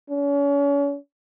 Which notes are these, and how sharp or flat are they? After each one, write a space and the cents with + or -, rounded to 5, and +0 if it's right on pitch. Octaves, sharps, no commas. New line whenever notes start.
C#4 +40